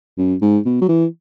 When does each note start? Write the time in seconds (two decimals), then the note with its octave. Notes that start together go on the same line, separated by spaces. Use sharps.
0.18 F#2
0.42 G#2
0.65 B2
0.82 F#3
0.89 E3